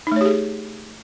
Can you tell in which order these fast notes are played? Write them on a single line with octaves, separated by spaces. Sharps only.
D#4 A3 C#5 G4 G#4